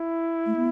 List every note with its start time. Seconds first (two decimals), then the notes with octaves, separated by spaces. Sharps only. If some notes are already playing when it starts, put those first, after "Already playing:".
Already playing: E4
0.46 A3
0.56 B3